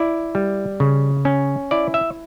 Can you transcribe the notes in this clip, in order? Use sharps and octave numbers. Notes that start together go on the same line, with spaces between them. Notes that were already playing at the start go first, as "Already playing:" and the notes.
Already playing: E4 D5
G3
C#3
C#4
E4 D5
E5